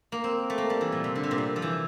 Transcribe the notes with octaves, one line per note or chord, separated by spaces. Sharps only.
A#3
C4
A3
A#3
G3
E3
A#2
C3
D3
C3
A#2
C3
F3
E3